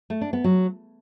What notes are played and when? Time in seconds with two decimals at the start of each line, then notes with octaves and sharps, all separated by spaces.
0.10 A3
0.21 D4
0.33 B3
0.44 F#3